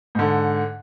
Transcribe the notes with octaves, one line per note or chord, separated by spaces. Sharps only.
G#2 D3